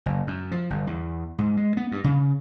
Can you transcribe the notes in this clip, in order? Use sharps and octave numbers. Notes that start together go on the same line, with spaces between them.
F#1
F#2
F3
G1
E2
G#2
G#3
B3
G2
C#3